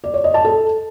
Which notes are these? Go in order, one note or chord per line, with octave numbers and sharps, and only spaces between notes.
D5
C#5
D#5
A5
A4